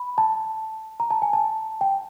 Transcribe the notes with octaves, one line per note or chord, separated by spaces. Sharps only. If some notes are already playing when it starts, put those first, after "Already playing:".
Already playing: B5
A5
A#5
A5
G#5
A5
G5